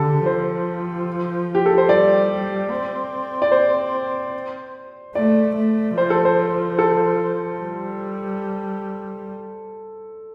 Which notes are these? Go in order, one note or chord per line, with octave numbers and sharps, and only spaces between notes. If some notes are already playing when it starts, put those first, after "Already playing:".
Already playing: D3 G4 A4
F3 C5
G4
A4
C5
G3 D5
C4
D5
C5
A3 D5
A3
F3 C5
A4
C5
A4
G3